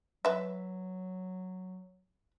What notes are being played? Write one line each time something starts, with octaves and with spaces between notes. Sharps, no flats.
F#3 B4 E5